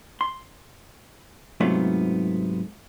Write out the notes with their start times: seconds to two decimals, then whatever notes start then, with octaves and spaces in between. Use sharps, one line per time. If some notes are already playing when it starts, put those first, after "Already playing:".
0.21 C6
1.60 G#2 C3 F#3 A3 B3 F4